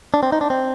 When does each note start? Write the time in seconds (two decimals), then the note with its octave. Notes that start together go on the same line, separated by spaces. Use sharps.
0.14 D4
0.23 C4
0.32 D#4
0.41 D4
0.50 C4